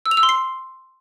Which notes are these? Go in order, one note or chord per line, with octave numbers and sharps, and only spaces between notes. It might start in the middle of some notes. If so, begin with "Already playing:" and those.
E6
F7
E6
C6
C7